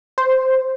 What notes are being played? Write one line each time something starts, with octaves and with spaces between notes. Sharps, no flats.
C5